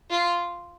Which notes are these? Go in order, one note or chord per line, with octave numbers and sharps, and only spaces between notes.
F4